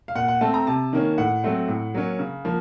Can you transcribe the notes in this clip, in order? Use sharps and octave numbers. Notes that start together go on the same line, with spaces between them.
F5
A#2 F#5
F#5
A3 C4 A5
A#5
C3 A5
D#3 A#3 C#4
A2 F#5
F#3 A3 C4
A2
F#3 A#3 C#4
C#3
F3 A#3